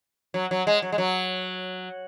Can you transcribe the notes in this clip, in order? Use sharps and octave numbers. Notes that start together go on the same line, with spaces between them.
F#3
F#3
G#3
F#3
G#3
F#3